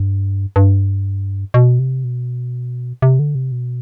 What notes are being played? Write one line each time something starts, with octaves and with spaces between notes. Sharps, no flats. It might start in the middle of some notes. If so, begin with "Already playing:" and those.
Already playing: G2
G2
B2
C3
B2
C3
D3
C3
B2